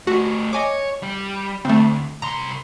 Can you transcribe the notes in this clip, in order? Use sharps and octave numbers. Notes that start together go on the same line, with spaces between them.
A3 F#4 G4
C#5 D#5 G#5 D6
G3
D2 A3 C4
C2 A#5 C6